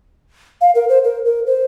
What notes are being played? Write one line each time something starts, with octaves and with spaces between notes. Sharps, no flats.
F5
A#4
C5
A#4
A#4
C5